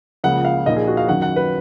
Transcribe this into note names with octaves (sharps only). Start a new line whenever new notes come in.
C#2 C#3 F3 A#3 F#5
F5
A#1 A#2 F3 A#3 D#4 D#5
G#4
F#4
F5
F#2 D#3 F#3 C#4 F#5
F#5
B4